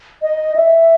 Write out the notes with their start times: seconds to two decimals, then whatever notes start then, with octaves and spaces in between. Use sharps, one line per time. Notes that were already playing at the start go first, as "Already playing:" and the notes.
0.22 D#5
0.56 E5